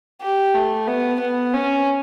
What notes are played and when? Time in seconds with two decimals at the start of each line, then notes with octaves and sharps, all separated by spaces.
0.22 G4
0.55 A3
0.87 B3
1.20 B3
1.53 C#4